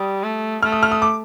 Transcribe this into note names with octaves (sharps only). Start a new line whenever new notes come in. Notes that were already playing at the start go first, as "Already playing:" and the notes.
Already playing: G3 D#6
A3
A3 F6
D#6
F6
D#6
D6